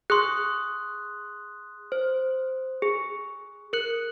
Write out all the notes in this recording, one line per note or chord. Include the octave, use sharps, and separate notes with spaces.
G#4 C6 D#6 F#6
C5
G#4
A#4 F#6 C#7 F#7